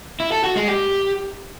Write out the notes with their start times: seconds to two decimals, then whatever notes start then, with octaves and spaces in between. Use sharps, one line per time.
0.20 E4
0.32 A4
0.44 F#4
0.56 G#3
0.68 G4